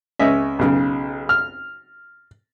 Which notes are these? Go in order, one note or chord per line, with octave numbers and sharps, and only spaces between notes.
C#2 C#4 D#5 E5
B1 C#3
F6